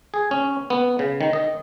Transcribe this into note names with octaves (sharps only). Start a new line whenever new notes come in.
G#4
C#4
B3
C#3
D#3
D#5